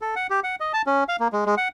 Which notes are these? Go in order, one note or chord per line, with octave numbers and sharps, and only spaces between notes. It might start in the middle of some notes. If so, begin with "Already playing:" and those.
A4
F#5
G4
F#5
D#5
A5
C#4
F5
A#3
G#3
G#3
F#5